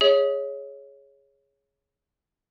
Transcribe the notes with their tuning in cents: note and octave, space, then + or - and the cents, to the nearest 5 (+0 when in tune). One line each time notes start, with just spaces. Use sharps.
G#4 +0 C#5 +0 E5 -45